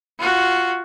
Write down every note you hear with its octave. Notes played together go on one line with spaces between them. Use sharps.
F4 F#4